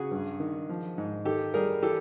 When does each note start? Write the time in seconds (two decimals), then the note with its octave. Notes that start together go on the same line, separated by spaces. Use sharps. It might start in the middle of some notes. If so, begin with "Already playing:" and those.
Already playing: C#3 F#4 G#4
0.11 G2
0.40 D#3
0.69 F3
0.98 G#2
1.25 D#3 G4 A4
1.54 G3 G#4 A#4
1.83 E3 G4 A4